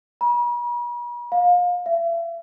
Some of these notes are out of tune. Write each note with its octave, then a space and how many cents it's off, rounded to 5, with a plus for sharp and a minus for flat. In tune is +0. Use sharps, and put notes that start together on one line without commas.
B5 -45
F5 +30
E5 +40